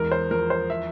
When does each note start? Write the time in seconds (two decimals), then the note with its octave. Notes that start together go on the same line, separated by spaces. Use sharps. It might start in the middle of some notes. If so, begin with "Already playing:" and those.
Already playing: E2 G#3 A#4
0.12 C5
0.31 F3 A#4
0.50 C5
0.70 E5